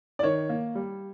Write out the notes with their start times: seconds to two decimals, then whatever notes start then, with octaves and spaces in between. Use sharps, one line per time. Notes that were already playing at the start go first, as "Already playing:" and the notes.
0.19 D5
0.23 D#3 C#5
0.49 A#3
0.75 G3